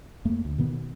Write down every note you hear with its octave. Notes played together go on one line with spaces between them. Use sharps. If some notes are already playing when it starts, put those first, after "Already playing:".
F2 A3 A#3
D2
B2 D#3 B3